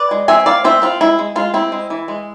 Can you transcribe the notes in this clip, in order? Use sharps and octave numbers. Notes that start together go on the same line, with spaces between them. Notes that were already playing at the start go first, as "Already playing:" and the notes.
Already playing: B4 D5
G#3
C4 E5 G#5
C4 D5 F5
C4 C5 E5
C4 F4
G#3 E4
G#3
G#3 F4
C4 E4
G#3
E3
G#3